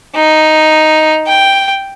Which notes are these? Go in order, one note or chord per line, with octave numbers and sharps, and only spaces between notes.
D#4
G5